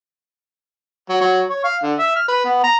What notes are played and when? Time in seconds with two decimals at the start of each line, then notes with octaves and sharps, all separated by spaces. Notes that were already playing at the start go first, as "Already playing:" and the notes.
1.09 F#3
1.21 F#3
1.50 C#5
1.64 F5
1.83 D3
1.99 E5
2.16 F6
2.28 B4
2.45 B3
2.64 A#5